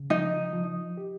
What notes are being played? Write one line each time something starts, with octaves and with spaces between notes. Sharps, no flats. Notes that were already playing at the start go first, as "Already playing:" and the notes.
Already playing: C#3
F3 D#4
F3
G4